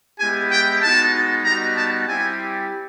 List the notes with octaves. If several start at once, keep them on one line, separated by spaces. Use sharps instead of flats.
G#3 B3 E4 G4 G#5
G5
G#3 B3 D#4 F#4 A5
G3 B3 D#4 F#4 A#5
A5
G3 C4 E4 G4 G#5